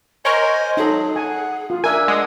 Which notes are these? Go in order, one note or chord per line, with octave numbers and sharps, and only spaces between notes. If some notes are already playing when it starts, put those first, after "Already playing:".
A#4 C5 C#5 D#5 G#5
F#3 D#4 G#4 A4
F#5 G#5
F4
D4 A#4 E5 G#5 E6
G#3 F#5 D#6